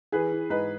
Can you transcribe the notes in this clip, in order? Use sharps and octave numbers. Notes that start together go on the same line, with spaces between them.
E3 G#4 B4
E3
G#2 B4 D#5